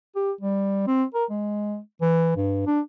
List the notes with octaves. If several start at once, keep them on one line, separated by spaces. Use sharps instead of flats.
G4
G3
C4
A#4
G#3
E3
G2
D4